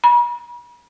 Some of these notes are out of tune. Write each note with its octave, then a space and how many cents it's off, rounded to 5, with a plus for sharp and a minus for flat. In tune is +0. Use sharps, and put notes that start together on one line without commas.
B5 -45